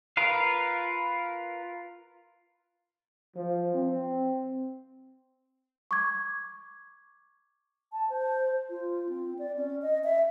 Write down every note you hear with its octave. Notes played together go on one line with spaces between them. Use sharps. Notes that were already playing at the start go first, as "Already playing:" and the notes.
F4 A#4 B4 F5
F3
C4
C#6 D6 G#6
A5
C5
F4
C4
D5
C#4
D#5
E5